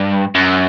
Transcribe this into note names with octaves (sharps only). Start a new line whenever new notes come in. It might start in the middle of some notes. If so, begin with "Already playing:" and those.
Already playing: G2
F#2